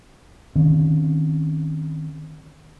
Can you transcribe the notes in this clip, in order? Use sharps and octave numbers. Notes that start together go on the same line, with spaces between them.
D#3 C4 C#4